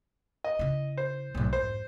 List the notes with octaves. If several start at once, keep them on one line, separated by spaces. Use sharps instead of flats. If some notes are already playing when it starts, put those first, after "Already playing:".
D#5
C#3 E4
C5
B1 A2
F2 G#2 C5